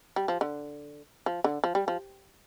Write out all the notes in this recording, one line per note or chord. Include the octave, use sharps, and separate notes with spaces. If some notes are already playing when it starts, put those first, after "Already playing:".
G3
F3
D3
F3
D3
F3
G3
F3